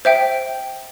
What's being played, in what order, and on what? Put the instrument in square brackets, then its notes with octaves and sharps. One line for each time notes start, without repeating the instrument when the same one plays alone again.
[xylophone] C5 E5 G5